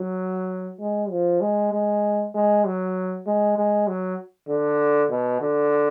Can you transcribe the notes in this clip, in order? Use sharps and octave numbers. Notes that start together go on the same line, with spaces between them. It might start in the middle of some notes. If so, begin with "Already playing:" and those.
Already playing: F#3
G#3
F3
G#3
G#3
G#3
F#3
G#3
G#3
F#3
D3
B2
D3